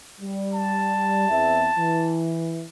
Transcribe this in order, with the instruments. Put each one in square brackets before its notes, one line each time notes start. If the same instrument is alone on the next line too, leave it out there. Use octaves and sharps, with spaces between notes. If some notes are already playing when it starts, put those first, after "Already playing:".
[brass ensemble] G3
[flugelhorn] A5
[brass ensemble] E2 C4 E5
E3